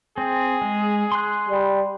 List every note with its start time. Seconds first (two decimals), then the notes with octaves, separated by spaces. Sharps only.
0.18 C4 G#4
0.62 G#3
1.12 C6 F#6
1.49 G3